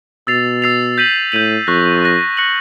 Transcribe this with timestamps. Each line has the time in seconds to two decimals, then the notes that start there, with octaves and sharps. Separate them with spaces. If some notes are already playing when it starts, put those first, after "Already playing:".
0.27 B2 E6 A6 C7 F7
0.62 E6 A6 C7 F7
0.98 G6 B6 D#7 F#7
1.32 A2 G6 B6 D#7 F#7
1.67 F2 C#6 F#6 A#6
2.03 C#6 F#6 A#6
2.37 C#6 F#6 A#6 C#7 F#7